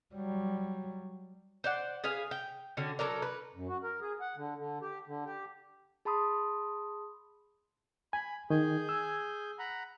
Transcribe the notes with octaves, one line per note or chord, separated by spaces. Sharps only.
F#3 G3
C5 D5 F#5
G#4 B4 F5 G#5
G5
D3 C#4 F#4
F#3 A4 A#4 D5
B4
F#2
F#4
A#4
G#4
F#5
D3
D3
G4
D3
G4
G#4 A5 B5 C6 D#6
G#5 B5
D#3 G#4 G#5 G6
E6
F#5 A#5 B5